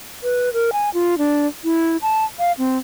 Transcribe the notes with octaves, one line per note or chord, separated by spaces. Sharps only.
B4
A#4
G#5
F4
D4
E4
A5
F5
C4